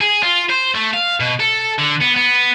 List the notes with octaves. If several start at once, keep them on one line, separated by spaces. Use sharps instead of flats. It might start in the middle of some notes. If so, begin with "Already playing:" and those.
G#4
F4
C5
A3
F5
B2
A4
D3
B3
B3